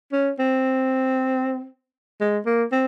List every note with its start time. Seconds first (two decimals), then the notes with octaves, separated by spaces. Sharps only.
0.12 C#4
0.39 C4
2.21 G#3
2.46 A#3
2.72 C4